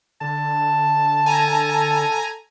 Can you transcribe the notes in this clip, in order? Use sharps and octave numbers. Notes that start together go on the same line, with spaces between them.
D3 A5
A4 G#5 A#5